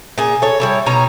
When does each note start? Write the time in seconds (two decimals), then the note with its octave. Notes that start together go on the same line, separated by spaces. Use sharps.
0.18 A#2 G#4
0.42 A4 C#5
0.60 G3 E4 C#5
0.86 B2 D#4 C#5 A#5